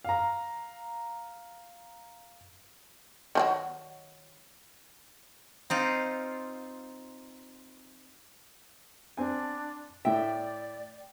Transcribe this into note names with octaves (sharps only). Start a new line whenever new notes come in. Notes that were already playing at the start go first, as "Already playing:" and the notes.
F5 A#5
D#3 F3 F#3
C4 D#4 F4
C4 D4 G#5
A2 D5 E5 G5